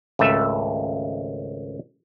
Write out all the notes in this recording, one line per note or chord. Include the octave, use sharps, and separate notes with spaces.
G#1 C#2 A3 E5